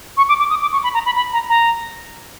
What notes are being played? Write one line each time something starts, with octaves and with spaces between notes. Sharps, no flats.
C#6
D6
D6
D#6
D6
C#6
B5
A#5
B5
B5
A#5
A#5